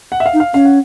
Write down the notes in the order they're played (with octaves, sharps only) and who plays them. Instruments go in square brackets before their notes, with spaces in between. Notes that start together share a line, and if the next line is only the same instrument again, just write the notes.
[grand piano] F#5
E5
F5
[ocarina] D#4
[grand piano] F5
[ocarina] C#4 [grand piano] F5
[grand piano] F#5